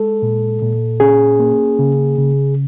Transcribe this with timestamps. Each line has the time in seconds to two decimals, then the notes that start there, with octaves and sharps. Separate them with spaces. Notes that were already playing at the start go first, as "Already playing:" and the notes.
Already playing: G#3 A4
0.22 A#2
0.62 A#2
1.00 C#4 G#4
1.39 A#3
1.79 C#3
2.18 C#3